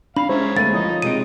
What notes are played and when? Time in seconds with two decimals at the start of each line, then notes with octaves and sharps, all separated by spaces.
0.16 D4 F5 B5
0.29 G#3 C#4 C5 C#5 E5 A#5
0.57 D2 G#3 A#3 F5 A6 D#7
0.74 F3 D#4 C#5 D#5 D#6
1.02 C3 G#3 D#4 D7 D#7